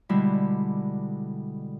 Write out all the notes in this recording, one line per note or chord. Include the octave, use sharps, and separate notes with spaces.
B2 D3 G3 G#3 E4